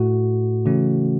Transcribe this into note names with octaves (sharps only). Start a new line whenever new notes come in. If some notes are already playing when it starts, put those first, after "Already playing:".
Already playing: A2 A3 F#4
C#3 E3 A3 C#4 F#4